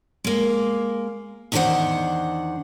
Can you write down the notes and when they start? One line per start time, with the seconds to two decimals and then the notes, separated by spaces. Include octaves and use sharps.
0.24 G#3 A#3
1.52 E2 D#3 D4 G4 C5 F#5